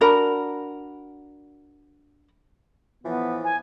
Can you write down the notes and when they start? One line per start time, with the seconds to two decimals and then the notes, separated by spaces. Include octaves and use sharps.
0.01 D4 F#4 A#4 B5
3.04 A2 E3 F3 B3
3.44 G#5